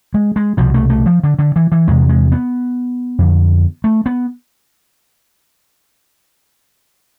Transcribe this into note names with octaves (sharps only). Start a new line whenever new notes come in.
G#3
G#3
C2 B2 F3
A3
A3
F3
D3
D3
E3
E3
E2 C3 G#3
G#3
B3
F2 D3
A3
B3